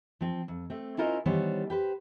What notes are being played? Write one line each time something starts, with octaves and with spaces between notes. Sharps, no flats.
F3 C4
F2
A3 C4
C#4 E4 F4 A#4 C5 D#5
D#3 E3 G3 B3 C5 C#5
G4 B4 C5